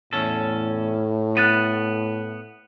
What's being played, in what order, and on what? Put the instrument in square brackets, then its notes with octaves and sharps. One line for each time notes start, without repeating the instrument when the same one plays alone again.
[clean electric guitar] E2 C#4 A4 [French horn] A2
[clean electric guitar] B3 [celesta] F#6 A6 D#7